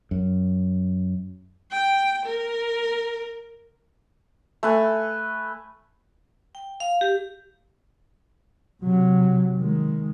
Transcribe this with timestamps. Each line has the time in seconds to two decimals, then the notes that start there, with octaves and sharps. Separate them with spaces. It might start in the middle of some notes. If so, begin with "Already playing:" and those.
0.11 F#2
1.72 G5
2.26 A#4
4.63 A3 B4 G#5
6.55 G5
6.80 F5
7.01 G4
8.82 C3 F#3
9.56 D#3 G#3